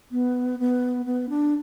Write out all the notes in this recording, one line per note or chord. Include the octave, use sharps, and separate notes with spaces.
B3
B3
B3
D4